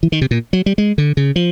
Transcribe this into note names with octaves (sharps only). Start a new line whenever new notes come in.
E3
D#3
C3
A#2
F#3
G3
G#3
D3
C#3
F3